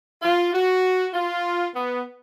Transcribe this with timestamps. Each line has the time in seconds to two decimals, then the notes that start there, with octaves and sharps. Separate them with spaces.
0.22 F4
0.53 F#4
1.14 F4
1.75 B3